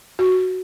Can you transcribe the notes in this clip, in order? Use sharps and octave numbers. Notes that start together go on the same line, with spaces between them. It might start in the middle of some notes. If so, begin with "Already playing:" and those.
F#4